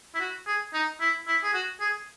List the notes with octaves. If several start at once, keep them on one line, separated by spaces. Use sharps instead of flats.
E4
F#4
G#4
D#4
E4
E4
G#4
F#4
G#4